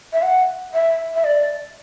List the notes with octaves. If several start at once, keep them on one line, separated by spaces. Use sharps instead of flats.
E5
F#5
E5
E5
D5